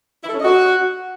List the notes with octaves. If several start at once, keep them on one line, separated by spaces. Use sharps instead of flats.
E4
A4
C#4
D#5
F#4